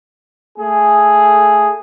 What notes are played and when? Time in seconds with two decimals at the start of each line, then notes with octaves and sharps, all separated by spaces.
0.58 A3 G#4